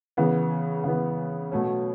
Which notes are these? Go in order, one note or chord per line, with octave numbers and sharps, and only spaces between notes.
C#3 E3 B3
C#3 E3 B3
B2 F#3 A3 C#4